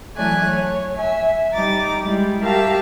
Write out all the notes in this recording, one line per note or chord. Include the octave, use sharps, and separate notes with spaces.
E3 F#3 A3 D5 G#5 F#6
C#5
E5 G#5
G3 D#4 A#5 D6 A6
G3 G#3 E4
F#4 G4 A#4 E5 F5 A5